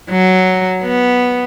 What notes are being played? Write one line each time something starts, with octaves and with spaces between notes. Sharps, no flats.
F#3
B3